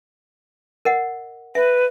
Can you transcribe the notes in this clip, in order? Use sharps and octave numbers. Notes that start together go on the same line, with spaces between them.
A#4 D#5 F#5
B4 E5